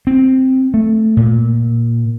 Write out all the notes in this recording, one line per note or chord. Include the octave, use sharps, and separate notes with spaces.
C4
A3
A#2